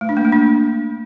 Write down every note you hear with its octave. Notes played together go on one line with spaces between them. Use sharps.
A3
D4
A#3
A3
D4